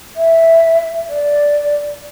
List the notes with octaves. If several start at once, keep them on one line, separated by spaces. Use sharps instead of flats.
E5
D5